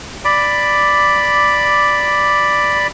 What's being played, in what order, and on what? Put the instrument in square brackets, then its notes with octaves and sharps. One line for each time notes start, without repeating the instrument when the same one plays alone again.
[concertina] D5 B5 D6